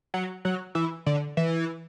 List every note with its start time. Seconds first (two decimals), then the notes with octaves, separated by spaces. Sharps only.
0.14 F#3
0.45 F#3
0.75 E3
1.06 D3
1.37 E3